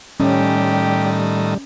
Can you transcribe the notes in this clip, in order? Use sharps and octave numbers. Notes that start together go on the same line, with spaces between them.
A2 D#3 G3 C#4 G4